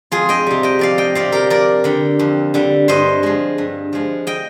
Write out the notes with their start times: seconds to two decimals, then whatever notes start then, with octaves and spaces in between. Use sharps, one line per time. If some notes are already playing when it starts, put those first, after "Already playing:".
0.12 F2 F4 G#4
0.29 D#5 G5
0.46 C3 G3
0.63 D#5 G5
0.79 F2 D5 F5
0.98 D#5 G5
1.15 C3 G3 D5 F5
1.32 G4 A#4
1.50 F2 A#4 D5
1.84 D3 G3
2.19 F2
2.54 D3 G3
2.88 G2 C5 D#5
3.23 F3 G#3
3.58 G2
3.93 F3 G#3
4.27 D#5 G5